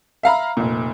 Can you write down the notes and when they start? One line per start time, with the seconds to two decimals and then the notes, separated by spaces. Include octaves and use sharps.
0.23 E5 F5 A#5 B5
0.57 F1 A#2